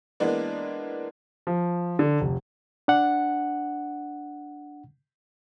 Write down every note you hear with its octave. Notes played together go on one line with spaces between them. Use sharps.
E3 G#3 A#3 B3 D4
F3
D3
F1
D4 F#5